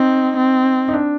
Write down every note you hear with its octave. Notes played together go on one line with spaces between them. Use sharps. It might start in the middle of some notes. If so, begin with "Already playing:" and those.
Already playing: C4 D#4
C4
D#4
D4